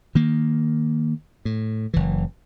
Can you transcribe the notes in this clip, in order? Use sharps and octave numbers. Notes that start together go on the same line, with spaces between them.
D#3 A#3
A2
F#1 E3